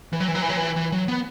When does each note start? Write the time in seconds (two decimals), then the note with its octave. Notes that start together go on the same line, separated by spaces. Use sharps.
0.13 E3
0.20 F#3
0.28 E3
0.35 F#3
0.42 E3
0.49 F#3
0.57 E3
0.76 E3
0.92 F#3
1.08 B3